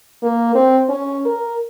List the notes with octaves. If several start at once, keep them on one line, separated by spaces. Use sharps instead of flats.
A#3
C4
C#4
A#4